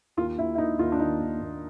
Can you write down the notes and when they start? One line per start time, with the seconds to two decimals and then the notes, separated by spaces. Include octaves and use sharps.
0.17 D#2 F4
0.38 D#2 E4
0.55 E4
0.58 D#2 D#4
0.79 D#2 F4
0.92 D4
1.00 D#3 D#4
1.20 D#2
1.41 D#2